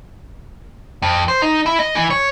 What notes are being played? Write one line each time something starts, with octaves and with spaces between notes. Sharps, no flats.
F2
C5
D#4
E4
D#5
E3
C#5